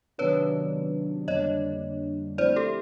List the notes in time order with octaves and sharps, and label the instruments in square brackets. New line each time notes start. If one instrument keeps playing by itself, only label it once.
[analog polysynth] C3 D#3 F#3 B3 D4 [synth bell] B4 C#5
[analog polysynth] F2 D3 G3 A#3 D4 [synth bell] C#5 D#5
[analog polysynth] F3 A3 C4 E4 [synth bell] C5 D5
[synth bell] G4 A4